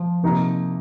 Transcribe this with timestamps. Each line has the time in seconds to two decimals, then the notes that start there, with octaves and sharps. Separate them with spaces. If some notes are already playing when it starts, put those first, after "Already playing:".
Already playing: F3
0.23 C3 F3 A#3 D#4